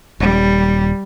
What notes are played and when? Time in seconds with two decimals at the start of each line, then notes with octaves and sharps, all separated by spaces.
0.20 D#1 G3